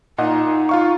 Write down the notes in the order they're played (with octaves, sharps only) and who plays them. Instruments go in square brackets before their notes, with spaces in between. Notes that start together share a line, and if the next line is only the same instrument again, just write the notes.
[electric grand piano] A#2 D#5 F#5 [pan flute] D#4
[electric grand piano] F4 F5 C#6